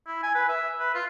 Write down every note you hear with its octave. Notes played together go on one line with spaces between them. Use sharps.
E4
G#5
B4
E5
B4
F4